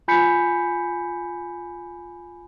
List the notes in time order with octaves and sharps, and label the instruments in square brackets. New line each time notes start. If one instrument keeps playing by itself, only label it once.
[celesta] F4 G#5 B5 G6 B6 C#7